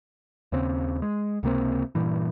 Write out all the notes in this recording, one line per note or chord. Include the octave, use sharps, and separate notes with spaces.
D#2 C#3 C4
G#3
C#2 C3 A#3 C4
G2 A#2 E3